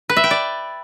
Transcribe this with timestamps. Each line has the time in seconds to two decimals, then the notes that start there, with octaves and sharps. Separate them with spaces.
0.09 B4
0.17 E5
0.24 G5
0.31 D5